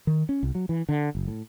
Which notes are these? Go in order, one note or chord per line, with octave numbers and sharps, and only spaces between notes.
D#3
C#4
C2
F#3
E3
D3
F#1
A2